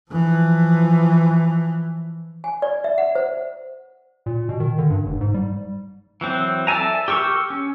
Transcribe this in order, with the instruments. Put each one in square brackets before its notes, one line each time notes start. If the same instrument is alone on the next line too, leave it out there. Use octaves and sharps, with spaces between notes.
[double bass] E3 F3
[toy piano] G#5
D5
E5
F#5
C5
[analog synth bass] A#2
B2
D#3
D3
G2
F1
G#2
G3
[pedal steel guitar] E3 F#3 C4
A4 D5 E5 G#5 A#5
G4 A#4 C#6 E6
C#4